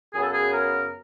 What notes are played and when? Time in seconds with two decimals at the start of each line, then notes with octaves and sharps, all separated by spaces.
0.13 F#2 C#3 F#3 B3 G#4
0.23 A4
0.33 G#4
0.53 A#4